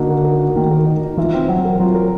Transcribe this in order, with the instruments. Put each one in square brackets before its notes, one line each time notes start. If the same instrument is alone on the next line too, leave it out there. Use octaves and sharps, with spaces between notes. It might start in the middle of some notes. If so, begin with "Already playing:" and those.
Already playing: [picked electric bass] D3 [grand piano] A#3 D#4 F#4
[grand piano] A#4
A#4
F#4
[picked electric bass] D#3 [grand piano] A#3
[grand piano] A#4
D#4
D#4
[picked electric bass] E3 [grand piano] F4
[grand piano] C4
[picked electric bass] F#3 [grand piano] C4
[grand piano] A#4
[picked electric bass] F#3 [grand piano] F4
[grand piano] A#4